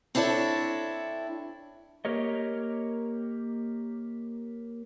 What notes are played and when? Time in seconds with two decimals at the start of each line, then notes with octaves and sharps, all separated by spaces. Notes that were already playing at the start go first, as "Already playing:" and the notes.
0.15 C4 D4 E4 A4 C#5
2.05 A#3 G4 A#4 C#5 D#5